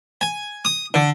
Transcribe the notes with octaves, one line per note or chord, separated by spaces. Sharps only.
G#5
D#6
D3